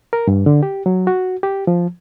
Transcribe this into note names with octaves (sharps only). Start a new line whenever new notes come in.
A#4
G2
D3
G4
F#3
F#4
G4
F3